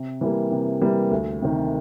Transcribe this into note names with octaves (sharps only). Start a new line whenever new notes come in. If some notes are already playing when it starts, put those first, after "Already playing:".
Already playing: C3
E3 G3 A#3
C3
E3 G3 A#3
D2
C3 D#3